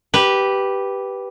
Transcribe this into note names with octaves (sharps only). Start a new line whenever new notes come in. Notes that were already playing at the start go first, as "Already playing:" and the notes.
G4 B4